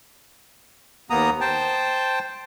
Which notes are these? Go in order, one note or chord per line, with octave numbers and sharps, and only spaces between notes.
D#2 A#3 B3 A#5 D#6
C5 G5 A5